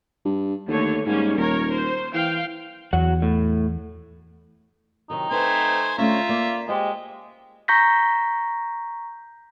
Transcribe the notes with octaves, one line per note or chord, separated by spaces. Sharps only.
G2
D#2 D3 A3 C#5
G#2 G3 A#3 C#4
D#1 A#4 C#5
C5
E3 F5 G5
E2 F#3 F#4 F#5
A2
C3 D#3 F#3 D#4
A3 C4 B4 C5 F#5 G#5
D3 A3 C#4 F4 E5 A#5
A#3 D5
G#3 G4 C5 D#5
A#5 C#6 G6 A#6 B6